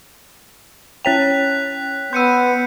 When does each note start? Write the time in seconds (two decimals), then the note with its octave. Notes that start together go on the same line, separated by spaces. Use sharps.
1.05 C#4 C#5 G5 F#6 B6 F7
2.13 B3 C6 E6 G6 C#7 D#7